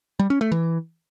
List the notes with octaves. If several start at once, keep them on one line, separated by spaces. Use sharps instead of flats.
G3
C#4
A3
E3